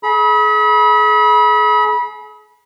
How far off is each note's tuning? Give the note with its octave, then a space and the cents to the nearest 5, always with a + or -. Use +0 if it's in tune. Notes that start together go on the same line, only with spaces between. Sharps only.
G#4 +40 B5 -25